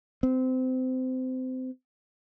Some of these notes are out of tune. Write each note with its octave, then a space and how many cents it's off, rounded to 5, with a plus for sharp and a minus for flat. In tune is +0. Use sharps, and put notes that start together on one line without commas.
C4 -25